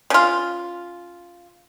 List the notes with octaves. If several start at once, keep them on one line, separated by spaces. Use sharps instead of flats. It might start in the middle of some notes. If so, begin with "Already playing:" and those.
C#3 F4